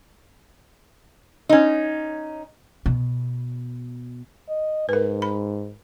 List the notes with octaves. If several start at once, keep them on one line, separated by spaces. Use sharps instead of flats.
C#4 D#4
B2
D#5
G#2 A#4 B4
B5